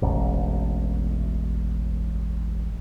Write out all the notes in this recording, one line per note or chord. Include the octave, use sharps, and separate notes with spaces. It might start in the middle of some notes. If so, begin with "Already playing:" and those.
E1 A1